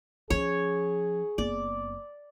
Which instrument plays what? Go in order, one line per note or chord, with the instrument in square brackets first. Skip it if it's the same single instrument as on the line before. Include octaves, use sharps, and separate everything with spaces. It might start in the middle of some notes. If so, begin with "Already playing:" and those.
[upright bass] F3 C#4 [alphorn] G#4 [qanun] C#5
[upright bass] F#1 B3 [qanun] D5